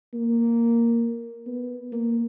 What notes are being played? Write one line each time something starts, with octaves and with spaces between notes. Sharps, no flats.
A#3
B3
A#3